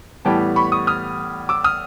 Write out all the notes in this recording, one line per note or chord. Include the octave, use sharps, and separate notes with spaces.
A2 E3 G3 B3 G5 A5
B5 C#6
C#6 D#6
D#6 F6
D6 E6
D#6 F6